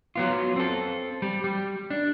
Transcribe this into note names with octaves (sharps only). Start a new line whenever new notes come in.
F#3 B3 F4
C4 A4
G3
G3
D4